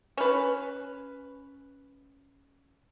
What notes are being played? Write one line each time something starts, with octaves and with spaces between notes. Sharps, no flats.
C#4 B4